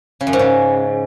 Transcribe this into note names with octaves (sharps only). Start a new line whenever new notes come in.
C#3
F#2
G#2
C#3